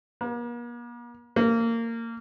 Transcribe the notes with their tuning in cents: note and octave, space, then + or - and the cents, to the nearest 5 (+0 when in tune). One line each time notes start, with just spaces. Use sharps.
A#3 +45
A#3 -20